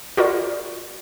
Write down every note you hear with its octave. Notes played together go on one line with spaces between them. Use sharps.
F4 F#4 A#4 D5